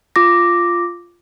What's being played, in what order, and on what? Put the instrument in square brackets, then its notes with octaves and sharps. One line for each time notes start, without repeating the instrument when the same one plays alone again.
[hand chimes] F4 D6 A#6